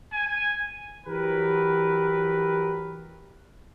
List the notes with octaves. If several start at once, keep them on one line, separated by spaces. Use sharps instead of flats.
G#5
E3 F#3 G4 A#4 B4